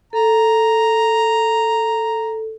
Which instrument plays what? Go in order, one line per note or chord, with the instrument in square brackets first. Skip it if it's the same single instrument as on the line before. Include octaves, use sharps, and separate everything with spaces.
[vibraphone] A4 [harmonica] A#5